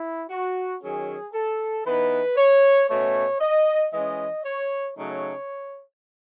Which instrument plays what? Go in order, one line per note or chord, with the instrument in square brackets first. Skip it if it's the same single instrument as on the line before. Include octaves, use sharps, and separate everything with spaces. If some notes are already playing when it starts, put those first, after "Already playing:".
Already playing: [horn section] E4
F#4
D#3 F#3 C#4 G#4
A4
E3 B3 D#4 B4
C#5
B2 A3 C#4 C#5
D#5
E3 G#3 C#4 D#5
C#5
C#3 F#3 A3 D#4 C#5